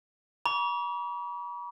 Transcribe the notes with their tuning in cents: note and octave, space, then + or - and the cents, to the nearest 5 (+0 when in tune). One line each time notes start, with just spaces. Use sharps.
B5 -45 D6 -45